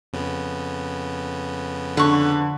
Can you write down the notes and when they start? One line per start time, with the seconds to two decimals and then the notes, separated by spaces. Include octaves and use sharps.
0.13 F2 C#3 B3
1.97 D3 B4 C#6